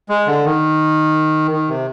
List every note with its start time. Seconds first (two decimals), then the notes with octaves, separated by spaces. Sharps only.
0.09 G#3
0.27 D3
0.44 D#3
1.51 D#3
1.68 C3